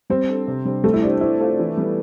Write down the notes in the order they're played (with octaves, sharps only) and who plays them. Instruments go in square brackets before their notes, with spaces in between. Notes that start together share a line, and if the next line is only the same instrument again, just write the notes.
[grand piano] G3 [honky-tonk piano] C4
[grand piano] D4 A4
C3
G3 D4 G4 C5
[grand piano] G3 [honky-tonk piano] A3
[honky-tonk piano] E4
[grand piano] C4 G4 C5 [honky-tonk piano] D4
[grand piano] C4 [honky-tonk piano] E4
[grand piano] F4 A4 C5
E3
G3 B3